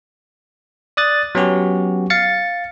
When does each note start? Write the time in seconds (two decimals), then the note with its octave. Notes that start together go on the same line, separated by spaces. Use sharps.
0.97 D5 D#6 F#6 A6
1.35 F#3 B3 C#4 F#4 G4
2.10 F5 A6 C#7